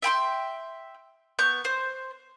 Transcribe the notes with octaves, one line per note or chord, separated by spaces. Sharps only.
E5 G5 B5 C6
B3 C#6 G6
C5